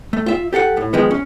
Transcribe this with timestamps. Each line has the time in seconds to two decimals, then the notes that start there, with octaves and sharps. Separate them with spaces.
0.13 A3
0.26 F4 E5
0.53 G4 A4 F5 F#5
0.77 A2
0.93 D#3 F3 G#3 B3
1.11 C#4